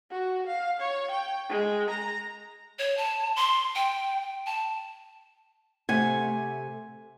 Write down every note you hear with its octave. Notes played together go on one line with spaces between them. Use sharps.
F#4
F5
C#5
G5
G#3
A#5
C#5
A5
C6
G5
A5
C3 A3 F#5 G#5